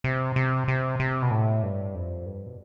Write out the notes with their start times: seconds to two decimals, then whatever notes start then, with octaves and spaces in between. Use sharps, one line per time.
0.04 C3
0.36 C3
0.68 C3
1.00 C3
1.22 B2
1.31 A2
1.63 G2
1.95 F2
2.26 G2
2.46 B2